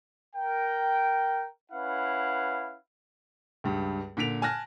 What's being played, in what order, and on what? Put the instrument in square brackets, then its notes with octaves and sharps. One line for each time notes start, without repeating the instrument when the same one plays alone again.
[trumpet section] A#4 G5
C#4 E4 B4 F5 F#5
[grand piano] C#2 G2
A#2 D3 B6 D7 F7
G#5 A5 F6 F#6 A#6